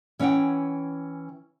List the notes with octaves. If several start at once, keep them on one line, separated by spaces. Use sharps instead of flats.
E3 C#4 D5 F#5 G5